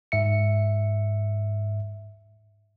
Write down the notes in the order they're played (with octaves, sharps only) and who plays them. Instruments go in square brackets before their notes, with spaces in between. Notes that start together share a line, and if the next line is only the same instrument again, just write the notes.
[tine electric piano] G#2 E5 C#7